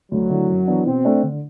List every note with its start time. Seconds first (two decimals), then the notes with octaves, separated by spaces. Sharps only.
0.11 D2 F#3
0.30 D3 A3 E4
0.48 F#2
0.67 E3 B3 D4
0.86 B2 C4
1.05 A3 D4
1.23 D3